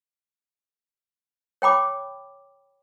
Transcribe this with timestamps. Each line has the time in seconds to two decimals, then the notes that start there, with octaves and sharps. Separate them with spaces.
1.62 C#5 G5 B5 D6